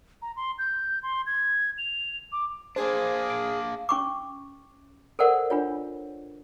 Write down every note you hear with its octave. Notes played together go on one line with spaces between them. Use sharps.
A#5
C6
G6
C6
G#6
F7
D6
A#3 D4 G#4 C5
D7
C#4 C#6 D6
A4 A#4 C5 D5 F#5
D4 F4 C#5